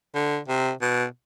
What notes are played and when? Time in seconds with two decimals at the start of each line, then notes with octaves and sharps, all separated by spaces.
0.14 D3
0.48 C3
0.82 B2